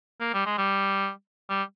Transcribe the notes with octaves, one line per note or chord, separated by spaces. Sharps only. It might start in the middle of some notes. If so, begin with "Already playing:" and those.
A#3
G3
G#3
G3
G3